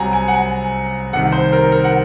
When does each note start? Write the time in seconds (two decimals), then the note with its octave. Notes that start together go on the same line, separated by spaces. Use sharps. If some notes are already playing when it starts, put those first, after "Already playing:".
Already playing: C2 C3 F#3 C4 F#5 G#5 A#5
0.13 G#5
0.28 F#5
0.34 G#5
1.13 C2 C3 D#3 F#5
1.32 C5
1.52 A#4
1.72 A#4
1.84 F#5